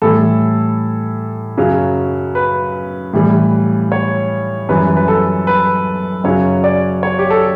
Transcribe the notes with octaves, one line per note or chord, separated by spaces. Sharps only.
A2 E3 G3 A4
F#2 C#3 F#3
B4
A2 E3 G3
C#5
F#2 E3 G3 B4
B4
A4
B4
F#2 C#3 F#3 C#5
D5
C#5
G4
A4